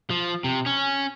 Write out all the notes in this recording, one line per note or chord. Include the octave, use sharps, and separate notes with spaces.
F3
C3
C#4